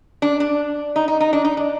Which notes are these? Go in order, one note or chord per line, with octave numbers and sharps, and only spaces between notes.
D4
D4
D#4
D#4
D#4
D4
D#4
D4